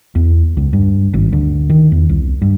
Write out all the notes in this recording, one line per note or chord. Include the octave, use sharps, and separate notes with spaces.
E2
C#2
G2
G#1
D2
D#3
E2
C2
G2